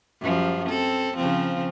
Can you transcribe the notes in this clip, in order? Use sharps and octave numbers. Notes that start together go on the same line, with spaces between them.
F#2 F3 G3
C4 A4
C#3 F3 C4